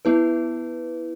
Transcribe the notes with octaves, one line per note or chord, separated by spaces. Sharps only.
B3 E4 B4